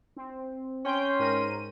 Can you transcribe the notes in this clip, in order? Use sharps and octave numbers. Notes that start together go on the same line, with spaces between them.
C4
C#4 G5 C6 G6
G#2 A#4 D#7